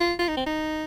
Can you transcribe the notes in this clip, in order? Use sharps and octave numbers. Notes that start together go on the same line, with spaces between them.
F4
F4
D#4
C4
D#4